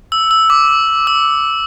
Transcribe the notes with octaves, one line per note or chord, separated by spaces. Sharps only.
E6
E6
D6
E6